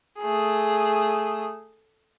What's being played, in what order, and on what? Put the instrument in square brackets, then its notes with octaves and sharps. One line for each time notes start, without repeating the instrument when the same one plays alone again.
[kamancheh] A3 G#4